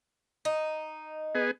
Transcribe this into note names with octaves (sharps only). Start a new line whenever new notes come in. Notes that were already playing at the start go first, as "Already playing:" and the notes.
D#4
B3 G#4